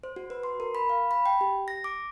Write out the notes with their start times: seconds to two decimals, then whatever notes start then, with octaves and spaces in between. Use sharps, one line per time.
0.03 C5
0.16 F#4
0.30 B4
0.43 C6
0.60 A#4
0.75 B5
0.89 F5
1.11 B5
1.26 G5
1.41 G4
1.68 A#6
1.84 D6